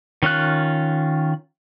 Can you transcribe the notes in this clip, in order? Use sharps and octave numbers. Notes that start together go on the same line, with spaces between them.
D#3 C#4 F4 F#6